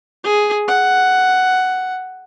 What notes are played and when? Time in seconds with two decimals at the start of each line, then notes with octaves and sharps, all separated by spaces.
0.24 G#4
0.68 F#5